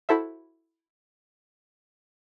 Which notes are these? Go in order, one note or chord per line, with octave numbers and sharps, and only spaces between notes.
E4 F#4 A4 C5 E5